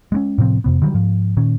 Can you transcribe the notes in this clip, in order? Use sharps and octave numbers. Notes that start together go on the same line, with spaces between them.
G#3 B3 C#4
A2 C3 F3 C4
F2 C3 B3
D3 D#3 F#3 G3
G#2 F3
A#2 D#3 C#4